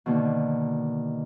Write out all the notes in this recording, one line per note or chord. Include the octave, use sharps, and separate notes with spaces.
B2 D3 D#3 A#3